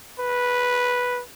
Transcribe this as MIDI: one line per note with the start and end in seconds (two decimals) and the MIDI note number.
0.20 1.21 71